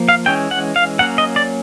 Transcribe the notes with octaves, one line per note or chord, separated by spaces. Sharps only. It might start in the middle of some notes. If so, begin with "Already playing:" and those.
Already playing: F3 A#3
F5
E3 G#3 C#4 G5
F#5
F5
F#3 A#3 C#4 F#5
D#5
D5